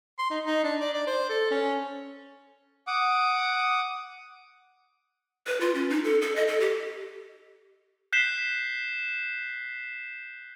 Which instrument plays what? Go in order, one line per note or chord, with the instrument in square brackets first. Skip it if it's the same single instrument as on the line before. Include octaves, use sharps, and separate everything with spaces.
[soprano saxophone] C6
D#4
D#4
D4
D5
D5
C5
A4
C#4
[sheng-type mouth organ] F#5 D6 D#6
[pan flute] B4
F4
C#4
D#4
A4
A4
D#5
A4
G4
[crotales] F#6 G6 B6 C7 E7 G7